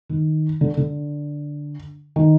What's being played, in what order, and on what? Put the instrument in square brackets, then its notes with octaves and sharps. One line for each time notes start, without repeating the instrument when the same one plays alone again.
[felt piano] D#3
D3
D3
D#3